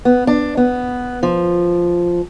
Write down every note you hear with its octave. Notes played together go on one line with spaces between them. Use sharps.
B3
D4
B3
F3